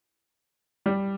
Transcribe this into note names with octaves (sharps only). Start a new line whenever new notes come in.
G3